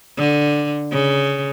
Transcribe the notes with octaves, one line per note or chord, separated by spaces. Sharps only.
D3
C#3